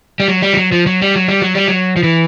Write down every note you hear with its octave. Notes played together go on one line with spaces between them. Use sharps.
G3
F#3
G3
F3
F#3
F3
F#3
G3
F#3
G3
F#3
G3
F#3
F3
E3